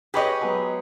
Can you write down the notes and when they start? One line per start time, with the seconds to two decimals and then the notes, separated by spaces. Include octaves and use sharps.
0.14 G4 G#4 B4 C#5 D#5
0.41 F#3 G#3 B3